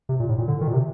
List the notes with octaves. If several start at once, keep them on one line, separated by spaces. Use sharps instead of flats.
C3
A#2
A2
A#2
D3
D#3
A#2
C3